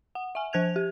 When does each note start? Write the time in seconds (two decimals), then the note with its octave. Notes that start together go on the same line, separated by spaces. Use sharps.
0.15 F#5
0.35 E5 G#5
0.53 F3 C5 F#6 G#6 F7
0.76 G4